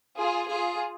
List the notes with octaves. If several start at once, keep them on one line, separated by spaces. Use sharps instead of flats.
F4 G#4
F4 G#4